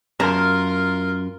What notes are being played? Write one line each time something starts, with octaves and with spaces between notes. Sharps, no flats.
F#2 F4 A#4 A5 A#5